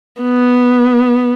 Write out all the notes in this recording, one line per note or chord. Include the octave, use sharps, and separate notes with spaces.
B3